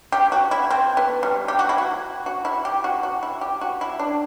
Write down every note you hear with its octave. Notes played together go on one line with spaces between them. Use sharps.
G4
F#4
E4
C4
B3
G3
G4
F#4
E4
F#4
F#4
E4
G4
F#4
F#4
E4
G4
F#4
E4
D4